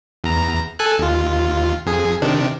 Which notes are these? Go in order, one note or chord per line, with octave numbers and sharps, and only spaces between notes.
E2 A#5
A4 G#5 F#6
D#2 F4
F2 G#4
C3 D#3 D4